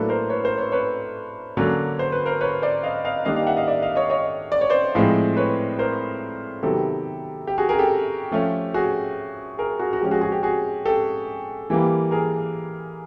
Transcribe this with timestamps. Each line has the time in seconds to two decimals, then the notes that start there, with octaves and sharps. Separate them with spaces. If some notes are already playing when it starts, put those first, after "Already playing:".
Already playing: A2 F#3 A#3 D4 A4 B4
0.09 A#4 C5
0.30 B4 C#5
0.44 A#4 C5
0.58 B4 C#5
0.72 B4 C#5
1.57 D3 F#3 A#3 C#4
1.99 C5
2.12 B4
2.26 A#4 C5
2.41 B4 C#5
2.62 C5 D5
2.83 D#5 F5
3.05 D#5 F5
3.25 D#3 G3 A#3 D4 D#5 F5
3.36 F5 G5
3.47 E5 F#5
3.57 D#5 F5
3.68 D5 E5
3.82 D#5 F5
3.95 C#5 D#5
4.10 C#5 D#5
4.52 D5
4.61 C#5
4.70 C5 D5
4.95 A2 F3 G#3 C4
5.37 B4 C#5
5.79 A#4 C5
6.63 C3 D#3 F#3 B3 G4 A4
7.47 G4
7.58 F#4 G#4
7.69 G#4 A#4
7.79 G4 A4
8.31 F3 A3 C#4
8.74 F#4 G#4
9.58 G#4 A#4
9.79 F#4 G#4
9.93 F#4
10.01 F3 G#3 C#4 G4
10.11 F#4 G#4
10.21 F#4 G#4
10.32 G4
10.43 F#4 G#4
10.85 G4 A4
11.70 E3 G3 A#3
12.11 G#4 A#4